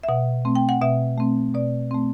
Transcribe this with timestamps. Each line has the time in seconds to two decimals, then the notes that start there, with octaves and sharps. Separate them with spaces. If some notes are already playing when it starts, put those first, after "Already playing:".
0.03 E5
0.08 B2 F#5
0.45 A3 C4
0.55 G5
0.69 F#5
0.81 B2 E5
1.18 A3 C4
1.55 B2 D5
1.91 A3 C4